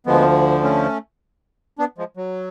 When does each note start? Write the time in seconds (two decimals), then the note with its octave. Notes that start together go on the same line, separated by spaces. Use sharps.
0.06 D2 D3 F3 G#3 B3
0.63 A3 C#4
1.78 B3 D4
1.98 F3 G#3
2.17 F#3